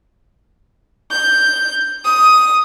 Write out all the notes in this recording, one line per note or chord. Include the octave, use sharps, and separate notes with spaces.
G6
D#6